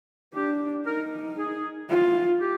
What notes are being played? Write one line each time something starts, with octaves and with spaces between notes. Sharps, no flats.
D4 G4
D#4 A#4
G#4
F4
G4